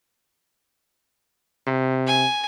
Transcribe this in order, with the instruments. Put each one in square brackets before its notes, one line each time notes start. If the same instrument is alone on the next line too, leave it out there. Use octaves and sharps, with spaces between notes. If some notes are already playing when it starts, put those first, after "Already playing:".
[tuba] C3
[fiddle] G#5